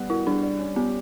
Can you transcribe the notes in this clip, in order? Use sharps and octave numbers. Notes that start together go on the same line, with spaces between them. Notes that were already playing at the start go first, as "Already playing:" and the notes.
Already playing: G3 B3
E4 F#4
G3 D4
D5
C#4
B3 G4